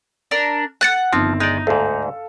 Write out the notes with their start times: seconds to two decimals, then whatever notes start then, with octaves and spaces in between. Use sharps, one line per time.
0.31 D4 A#4 A#5
0.81 F#5 F#6 A6 C#7
1.13 G1 D#3 F3 C4
1.40 G#3 D#4 D5
1.67 D2 G#2 A4 F5